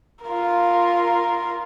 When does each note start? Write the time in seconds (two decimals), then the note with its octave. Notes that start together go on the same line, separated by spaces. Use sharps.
0.25 F4 A#4